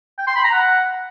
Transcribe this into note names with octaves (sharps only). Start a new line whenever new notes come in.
G5
C6
B5
A#5
F#5